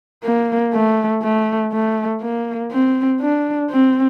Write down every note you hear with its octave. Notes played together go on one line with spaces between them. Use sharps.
A#3
A3
A3
A3
A#3
C4
D4
C4